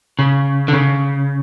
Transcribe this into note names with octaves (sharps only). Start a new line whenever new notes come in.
C#3
D3
C#3